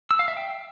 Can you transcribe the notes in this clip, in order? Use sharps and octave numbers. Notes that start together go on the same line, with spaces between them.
E6
F5
E5
G5